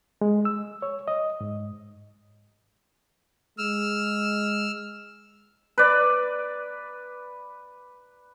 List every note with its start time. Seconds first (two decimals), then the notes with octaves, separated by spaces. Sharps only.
0.21 G#3
0.45 E6
0.82 C#5
1.08 D#5
1.41 G#2
3.58 G#3 E6 F6
5.78 B4 D5